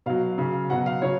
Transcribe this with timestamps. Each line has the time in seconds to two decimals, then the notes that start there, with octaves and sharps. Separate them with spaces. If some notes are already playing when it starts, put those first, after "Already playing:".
0.06 B2 F#3 F5
0.38 C#3 F#3
0.69 B2 F#3 F#5
0.86 F5
1.02 C#3 F#3 C#5